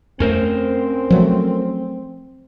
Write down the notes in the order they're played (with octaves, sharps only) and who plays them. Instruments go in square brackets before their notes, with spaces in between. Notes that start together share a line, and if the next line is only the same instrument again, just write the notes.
[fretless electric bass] F2 A3 [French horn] C4 [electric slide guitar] C#4 A#4 C5
[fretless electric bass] F3 F#3 A3